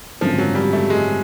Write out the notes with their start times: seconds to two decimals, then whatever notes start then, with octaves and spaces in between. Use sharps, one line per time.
0.21 G#1 F#2 D3 F3
0.38 F#3
0.55 G3
0.73 A3
0.90 G#3